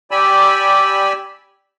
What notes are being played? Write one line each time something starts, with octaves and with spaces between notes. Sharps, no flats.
G4 D5 G#5 B5 E6